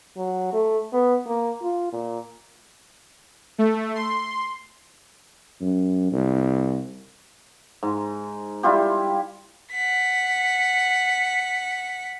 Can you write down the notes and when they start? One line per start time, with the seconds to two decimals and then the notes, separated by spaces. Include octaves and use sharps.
0.17 F#3
0.53 A3
0.93 B3
1.26 A#3
1.62 F4
1.93 A#2
3.58 A3
3.95 C6
5.61 F#2
6.12 C2
7.83 G#2
8.63 G3 E4 F4 G4
9.72 F#5 B6